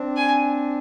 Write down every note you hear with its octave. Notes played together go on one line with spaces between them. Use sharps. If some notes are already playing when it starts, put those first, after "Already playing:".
Already playing: C4 D4
G#5